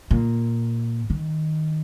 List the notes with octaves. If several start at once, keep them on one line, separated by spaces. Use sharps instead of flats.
A#2
D#3